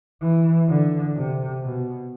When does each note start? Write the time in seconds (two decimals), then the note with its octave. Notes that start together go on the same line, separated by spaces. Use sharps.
0.21 E3
0.68 D3
1.15 C3
1.62 B2